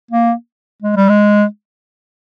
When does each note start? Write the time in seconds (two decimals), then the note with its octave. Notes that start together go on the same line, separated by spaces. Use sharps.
0.11 A#3
0.83 G#3
0.97 G3
1.10 G#3